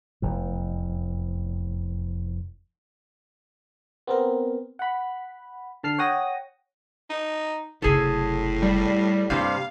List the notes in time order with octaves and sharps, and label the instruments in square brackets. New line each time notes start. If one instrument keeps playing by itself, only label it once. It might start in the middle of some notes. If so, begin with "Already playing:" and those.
[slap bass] F1 E2
[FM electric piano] B3 C4 A#4
F#5 B5
D3 A5 F6 C7
C#5 F#5 G5 D#6 A#6
[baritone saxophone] D#4
[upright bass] F#1 C3 [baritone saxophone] A2 [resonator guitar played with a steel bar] G#4 A4
[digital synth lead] G3
[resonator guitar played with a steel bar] G2 C3 G3 [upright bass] A#3 [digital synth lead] F5